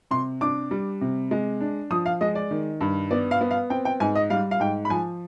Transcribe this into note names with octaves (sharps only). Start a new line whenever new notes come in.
C3 C6
D4 D6
G3
C3
G#3
D4
F3 D#6
F5
G#3 D#5
D5
D#3
G2
B3 D5
F5
B3
F5
C4 G5
G5
G#2 G#5
D#5
G3 F5
F5
G#2 G5
B5
F3 G#5